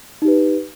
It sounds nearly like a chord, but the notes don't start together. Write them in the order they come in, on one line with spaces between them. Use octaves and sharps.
D#4 G4 B4